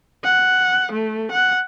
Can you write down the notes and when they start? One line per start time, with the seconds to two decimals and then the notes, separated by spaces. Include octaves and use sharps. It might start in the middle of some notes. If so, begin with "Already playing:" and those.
0.24 F#5
0.92 A3
1.32 F#5